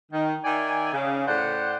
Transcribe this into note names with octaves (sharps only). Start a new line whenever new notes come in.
D#3
D#3 D5 E5 G#5
C#3
A2 C5 D5 F#5